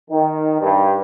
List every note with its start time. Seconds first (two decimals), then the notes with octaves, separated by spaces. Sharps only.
0.11 D#3
0.60 G2